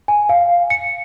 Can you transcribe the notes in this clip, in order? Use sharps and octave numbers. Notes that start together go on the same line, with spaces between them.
G#5
F5
C#7